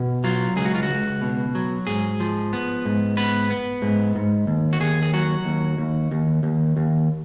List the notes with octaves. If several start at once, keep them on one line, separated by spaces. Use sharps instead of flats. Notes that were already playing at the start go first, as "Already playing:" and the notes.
Already playing: B2
F#3 F4
C#2 G#4
F#4
F4
F#4
C#2
B2
F#3
G#2 G#4
F3
B3
G#2
B3 B4
B3
G#2
G#2
D#2
F#4
D#2 G#4
G#4
F#3 F#4
D#2
D#2
D#2
D#2
D#2